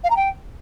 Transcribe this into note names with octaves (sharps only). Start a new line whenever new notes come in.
F5
A#5
G5